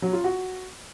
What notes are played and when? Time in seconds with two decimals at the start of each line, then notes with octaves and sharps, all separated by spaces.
0.02 F#3
0.13 F4
0.24 F#4